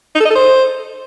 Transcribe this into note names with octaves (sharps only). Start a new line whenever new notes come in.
D#4
A4
D#5
A4
C5